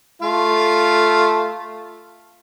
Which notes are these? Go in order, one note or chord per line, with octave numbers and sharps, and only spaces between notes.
A3 F4 F5